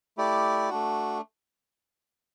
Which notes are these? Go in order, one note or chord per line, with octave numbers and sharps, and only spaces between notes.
A3 E4 G4 D5
A3 D4 F#4